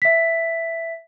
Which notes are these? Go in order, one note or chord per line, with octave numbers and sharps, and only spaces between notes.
E5 B6